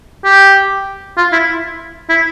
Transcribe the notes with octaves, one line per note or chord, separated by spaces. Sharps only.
G4
F4
E4
E4